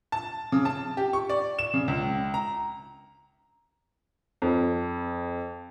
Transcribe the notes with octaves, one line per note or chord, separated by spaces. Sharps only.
A5
C#3
A5
G4
C#6
D5
E7
C#3
C#2
A#5
F2